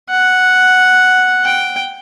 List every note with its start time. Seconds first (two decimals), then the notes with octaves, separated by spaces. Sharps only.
0.11 F#5
1.44 G5